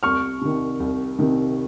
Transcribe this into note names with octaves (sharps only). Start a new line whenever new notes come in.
C2 C#6 F6
C3 D#3
C2
C3 D#3